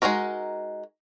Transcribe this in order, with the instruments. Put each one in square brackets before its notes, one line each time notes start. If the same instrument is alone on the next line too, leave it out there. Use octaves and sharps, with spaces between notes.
[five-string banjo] G#3 A#3 D#4 F#4 A#4